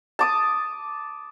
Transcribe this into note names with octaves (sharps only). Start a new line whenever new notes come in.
A5 D6 D#6